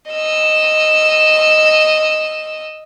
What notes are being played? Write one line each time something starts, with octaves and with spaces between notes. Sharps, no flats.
D#5 E6